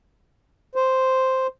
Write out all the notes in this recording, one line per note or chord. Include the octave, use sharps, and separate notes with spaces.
C5